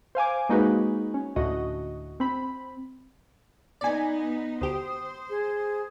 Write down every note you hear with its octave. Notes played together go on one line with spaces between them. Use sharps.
C5 F5 G#5 D6
G#3 A#3 D#4 F#4 G#4 B4
C#4
D2 A2 F#4 D#5
C4 B5
B3 D#4 D5 G#5
D2 G4 C5 D#6
G#4